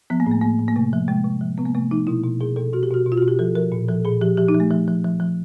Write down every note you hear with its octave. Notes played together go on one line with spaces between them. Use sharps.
F3 B3
A#3
A2
A3
A2 A#3
A2
A#3
C3 A3
F3
C3 G#3
C3
F3
C3 B3
A#3
C3 A3
F3 D#4
B2 E4
B2
B2 G#4
B2 A4
B2 F#4
G4
B2 F#4
B2
F4
B2 F#4
G4
F3 A4
F3 A#4
A#2
F3 A4
A#2 G#4
F3 G4
F3 G4
D#4
F3
A3
F3
F3
F3
F3